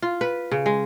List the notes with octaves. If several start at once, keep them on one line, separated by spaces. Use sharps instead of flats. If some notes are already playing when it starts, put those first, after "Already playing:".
F4
B4
C#3
G#3